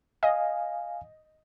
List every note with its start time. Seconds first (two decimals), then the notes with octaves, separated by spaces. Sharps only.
0.23 D#5 F5 G#5